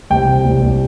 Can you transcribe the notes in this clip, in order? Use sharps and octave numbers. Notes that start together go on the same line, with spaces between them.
C2 G5
C3
C2
C2